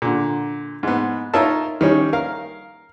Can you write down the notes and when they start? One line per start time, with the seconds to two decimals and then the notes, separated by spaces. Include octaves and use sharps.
0.02 A#2 D3
0.83 G#2 B3
1.34 D#4 F4 A#4 C#5 E5 A5
1.81 D#3 G3 C#4
2.13 A#4 F5